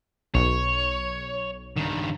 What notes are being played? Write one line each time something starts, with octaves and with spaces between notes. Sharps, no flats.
B1 C#5
G2 D#3